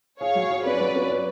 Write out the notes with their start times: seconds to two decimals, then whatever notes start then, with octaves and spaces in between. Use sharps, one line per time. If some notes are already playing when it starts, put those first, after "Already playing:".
0.20 G#4 C#5 F5
0.35 F#3
0.50 G#4
0.65 C#4 B4 D5
0.80 F#3
0.95 C#4
1.10 B4